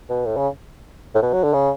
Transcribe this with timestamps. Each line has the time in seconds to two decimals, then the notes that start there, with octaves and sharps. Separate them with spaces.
0.10 B2
0.26 A2
0.37 C#3
1.15 A2
1.23 B2
1.33 F#3
1.44 D3
1.54 C#3